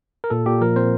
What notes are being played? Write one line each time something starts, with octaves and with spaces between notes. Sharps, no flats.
A#4
A#2 A4
A#2 G4
F3 A#4
C4 C5